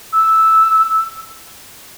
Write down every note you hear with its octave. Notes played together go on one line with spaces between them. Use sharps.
E6